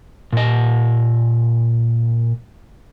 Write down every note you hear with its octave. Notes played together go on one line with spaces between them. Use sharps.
A#2 D#5